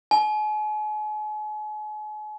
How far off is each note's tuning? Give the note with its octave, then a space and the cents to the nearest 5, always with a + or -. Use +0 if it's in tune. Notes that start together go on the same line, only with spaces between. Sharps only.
G#5 +40